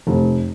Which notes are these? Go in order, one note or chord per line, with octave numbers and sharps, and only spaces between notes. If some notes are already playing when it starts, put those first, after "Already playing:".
F1